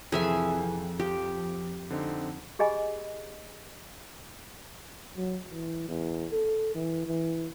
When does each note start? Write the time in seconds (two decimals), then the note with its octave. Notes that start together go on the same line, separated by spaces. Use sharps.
0.12 F2 C3 E3 G#4 E5 G#5
0.99 F3 G4
1.90 D3 C4 D#4
2.59 G4 G#4 D#5 G#5 B5
5.17 F#3
5.49 E3
5.88 E2
6.32 A4
6.75 E3
7.07 E3